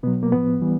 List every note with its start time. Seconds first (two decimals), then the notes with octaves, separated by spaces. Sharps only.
0.03 B2 F#3 B3
0.23 A#3
0.32 A2 F3 B3
0.62 E3 G3